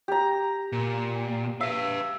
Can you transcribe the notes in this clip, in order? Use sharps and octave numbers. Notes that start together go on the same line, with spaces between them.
G4 A#5
A#2
B4 E5 F5